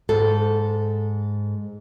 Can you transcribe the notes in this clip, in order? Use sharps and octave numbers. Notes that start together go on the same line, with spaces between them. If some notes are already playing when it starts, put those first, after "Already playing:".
G#2 A4